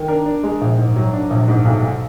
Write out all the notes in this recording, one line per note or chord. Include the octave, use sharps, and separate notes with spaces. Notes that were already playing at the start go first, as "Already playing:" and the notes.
Already playing: D#3
D4 A#4
D4
G#3
A#1
G#2
F#3
D4
A#1
G#2
B1
B1